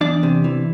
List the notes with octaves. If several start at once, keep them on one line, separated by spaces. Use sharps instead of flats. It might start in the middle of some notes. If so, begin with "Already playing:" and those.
E2 D4 D5
C3
E3